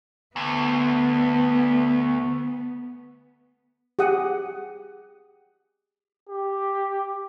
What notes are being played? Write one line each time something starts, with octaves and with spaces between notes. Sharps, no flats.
D2 B3
G4 G#4 F#5 D#6
G4